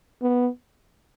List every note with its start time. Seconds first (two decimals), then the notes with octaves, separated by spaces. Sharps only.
0.22 B3